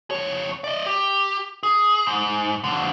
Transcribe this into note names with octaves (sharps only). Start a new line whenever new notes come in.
F2 C#5
D5 D#5
G4
G#4
G#2
F2 D3